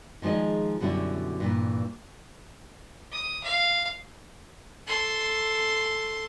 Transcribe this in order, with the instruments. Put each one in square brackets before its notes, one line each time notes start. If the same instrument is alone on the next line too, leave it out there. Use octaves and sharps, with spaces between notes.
[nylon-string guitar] D#3 F3 G#3 G#4 D#5
F#2 B2 D3 G3 C#4 E4
G2 A#2 E3
[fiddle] D#6
F5
[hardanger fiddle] A4 C6